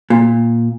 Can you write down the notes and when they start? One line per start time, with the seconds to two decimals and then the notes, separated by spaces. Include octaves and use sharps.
0.10 A#2